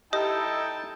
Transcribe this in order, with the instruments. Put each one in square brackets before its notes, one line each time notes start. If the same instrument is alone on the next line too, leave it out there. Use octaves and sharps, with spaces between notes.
[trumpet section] D#4 E4 A4 [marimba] G4 [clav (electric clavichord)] D#5 [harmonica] G5 A5